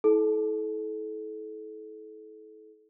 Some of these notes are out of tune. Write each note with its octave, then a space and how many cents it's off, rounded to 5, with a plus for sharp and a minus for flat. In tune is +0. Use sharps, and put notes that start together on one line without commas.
E4 -25 A4 -30